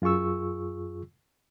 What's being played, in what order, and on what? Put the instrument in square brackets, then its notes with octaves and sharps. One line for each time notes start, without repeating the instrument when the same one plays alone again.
[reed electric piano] F#2 F4 G#4 C#6 E6